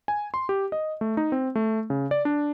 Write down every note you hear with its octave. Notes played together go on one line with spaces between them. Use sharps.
G#5
C6
G4
D#5
A3
D#4
C4
A3
C#3
D5
D4